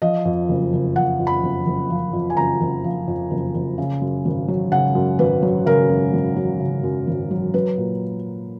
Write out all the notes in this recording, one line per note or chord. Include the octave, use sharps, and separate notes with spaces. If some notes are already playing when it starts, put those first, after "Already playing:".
F3 D#5
F2
F#1
F#1
F3 F#5
F2
B5
F#1
F#1
F3
F2
G#5
F#1 A#5
F#1
F3
F2
F#1
F#1
C#3
F#2
G#1
F#3
C#3 F#5
F#2
G#1 B4
F#3
C#3 A#4
F#2
G#1
F#3
C#3
F#2
G#1
F#3
F#3 B4
A#2